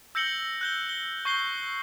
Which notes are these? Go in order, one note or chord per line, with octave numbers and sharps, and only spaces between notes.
E6 G6 A#6 C#7 F#7 G7
F#6 G6 G7
G7
C#6 G6 C7 G7